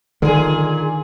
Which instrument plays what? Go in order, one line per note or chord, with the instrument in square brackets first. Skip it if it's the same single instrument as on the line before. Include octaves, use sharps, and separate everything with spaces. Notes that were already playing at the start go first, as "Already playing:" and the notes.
[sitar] A#2 G#4 [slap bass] D3 D#3